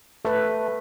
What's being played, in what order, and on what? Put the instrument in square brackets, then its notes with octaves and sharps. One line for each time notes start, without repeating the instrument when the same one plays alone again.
[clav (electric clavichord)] A3 [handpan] A4 B4